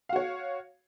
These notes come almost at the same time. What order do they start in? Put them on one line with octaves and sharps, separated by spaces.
F5 F#4 C#5